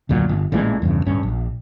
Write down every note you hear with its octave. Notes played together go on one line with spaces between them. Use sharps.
F1 D2 A#2 F#3
G1
A1 A#2 E3 G#3
E2 G2 C#3
D1 G2 C#4
A#1